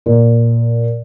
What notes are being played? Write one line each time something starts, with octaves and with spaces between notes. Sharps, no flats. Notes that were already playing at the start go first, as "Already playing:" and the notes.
A#2